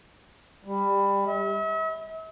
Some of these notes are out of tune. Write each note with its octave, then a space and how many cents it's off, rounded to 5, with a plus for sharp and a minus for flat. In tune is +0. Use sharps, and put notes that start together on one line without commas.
G3 +20
E5 -40